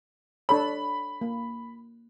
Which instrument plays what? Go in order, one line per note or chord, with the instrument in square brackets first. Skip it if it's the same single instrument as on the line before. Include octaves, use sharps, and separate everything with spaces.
[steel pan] D4 A4 C#5 [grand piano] B5
[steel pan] A#3